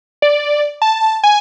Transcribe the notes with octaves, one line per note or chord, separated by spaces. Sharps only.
D5
A5
G#5